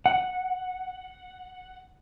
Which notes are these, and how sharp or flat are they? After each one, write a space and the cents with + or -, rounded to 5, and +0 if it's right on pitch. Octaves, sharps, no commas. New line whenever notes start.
F#5 -5